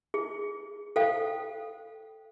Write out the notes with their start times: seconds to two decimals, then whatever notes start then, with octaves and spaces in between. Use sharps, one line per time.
0.14 G#4
0.96 A4 C5 F5 G5